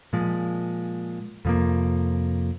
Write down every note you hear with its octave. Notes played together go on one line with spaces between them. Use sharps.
A#2 F3 G#3
F2 C3 F3 A#3